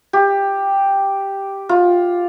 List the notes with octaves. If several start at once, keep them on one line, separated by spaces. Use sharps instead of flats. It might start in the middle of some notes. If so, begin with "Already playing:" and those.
G4
F4